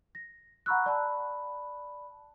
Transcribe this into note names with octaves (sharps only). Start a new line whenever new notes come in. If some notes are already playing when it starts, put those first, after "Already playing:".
A#6
F#5 A#5 B5 C#6 E6 F#6
D5 A5 B5